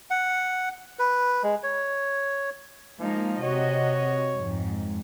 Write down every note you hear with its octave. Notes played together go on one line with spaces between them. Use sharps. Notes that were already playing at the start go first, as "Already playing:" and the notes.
F#5
B4
G#3
C#5
F3 G#3 A#3 D#4
C3 F#4 C#5 D#5
F2 G#2